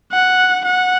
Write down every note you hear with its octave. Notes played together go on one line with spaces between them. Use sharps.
F#5
F#5